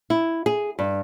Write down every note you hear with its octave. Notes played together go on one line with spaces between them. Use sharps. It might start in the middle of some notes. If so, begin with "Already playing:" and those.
E4
G#4
G2